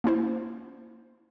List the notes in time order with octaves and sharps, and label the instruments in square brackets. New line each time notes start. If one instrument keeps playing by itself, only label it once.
[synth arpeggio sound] A#3 C#4 E4 C5